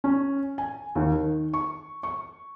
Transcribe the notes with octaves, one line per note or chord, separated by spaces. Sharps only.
C#4
G#5
D#2
D#3
C#6
C#6